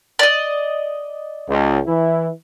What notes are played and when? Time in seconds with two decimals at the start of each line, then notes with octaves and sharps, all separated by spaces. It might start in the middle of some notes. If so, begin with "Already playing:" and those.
0.19 D5 D#5
1.49 C#2
1.86 E3 E4